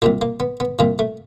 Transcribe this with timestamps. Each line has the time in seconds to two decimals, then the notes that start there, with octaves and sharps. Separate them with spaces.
0.02 C2 A#2 F3 A#3
0.21 A#3
0.40 B3
0.60 B3
0.79 C2 A#2 F3 A#3
0.99 A3